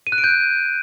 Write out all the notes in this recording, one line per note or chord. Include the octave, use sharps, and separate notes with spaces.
D#7
F#6
D7
G6